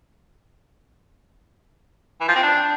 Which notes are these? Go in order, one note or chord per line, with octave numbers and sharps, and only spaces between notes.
E3
F3
C4
D4